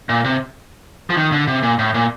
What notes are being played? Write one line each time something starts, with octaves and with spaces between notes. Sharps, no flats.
A#2
C3
F3
D#3
D3
C3
A#2
A2
A#2